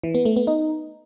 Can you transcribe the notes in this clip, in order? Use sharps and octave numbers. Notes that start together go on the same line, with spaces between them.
E3
B3
A3
B3
D#4